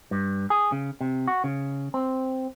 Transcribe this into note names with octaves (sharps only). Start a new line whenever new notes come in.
G2
G#4
C#3
C3
F#4
C#3
C4